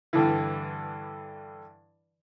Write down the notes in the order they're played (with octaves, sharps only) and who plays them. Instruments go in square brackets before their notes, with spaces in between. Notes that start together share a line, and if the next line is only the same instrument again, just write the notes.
[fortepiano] G2 D3 E3